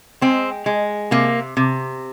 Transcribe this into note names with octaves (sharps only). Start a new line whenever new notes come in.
G#3 C4
G#3
C3 A#3
C3